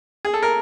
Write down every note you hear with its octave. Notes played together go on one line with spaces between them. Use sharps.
G#4
A4
A#4